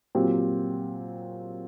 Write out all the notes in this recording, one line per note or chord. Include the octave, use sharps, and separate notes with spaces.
A#2 F#3 C4 G4 C5